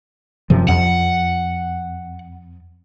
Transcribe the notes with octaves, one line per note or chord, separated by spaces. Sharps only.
F#2 C3 F3
F2 F#5